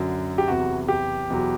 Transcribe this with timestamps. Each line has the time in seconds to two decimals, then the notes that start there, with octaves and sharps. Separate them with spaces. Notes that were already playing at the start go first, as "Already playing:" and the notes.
Already playing: F#2 D3 F#3
0.38 G4
0.48 E2 C3 F#3 F#4
0.88 G4
1.30 E2 B2 F#3